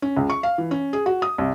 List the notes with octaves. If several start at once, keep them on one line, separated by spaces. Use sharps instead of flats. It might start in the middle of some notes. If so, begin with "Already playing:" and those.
C#4
C#2
C#6
F5
E3
C#4
G#4
F#4
D#6
C2